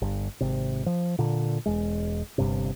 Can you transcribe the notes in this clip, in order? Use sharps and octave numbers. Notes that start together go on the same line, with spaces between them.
G1
G#1 C3
F3
A#2 D3
E1 G#3
G1 G2 C3